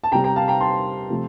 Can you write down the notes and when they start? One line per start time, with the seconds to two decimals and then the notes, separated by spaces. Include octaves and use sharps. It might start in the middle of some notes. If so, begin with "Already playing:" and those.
0.04 A5
0.12 C3 G3 G5 A#5
0.24 G5 A#5
0.36 F5 A5
0.48 G5 A#5
0.61 A5 C6
1.10 C3 F3 A3